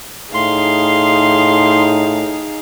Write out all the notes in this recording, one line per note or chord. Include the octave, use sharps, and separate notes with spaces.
A2 D#4 G#4 F5 C6